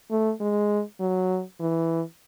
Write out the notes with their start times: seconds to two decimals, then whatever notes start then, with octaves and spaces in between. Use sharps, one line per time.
0.11 A3
0.40 G#3
1.00 F#3
1.60 E3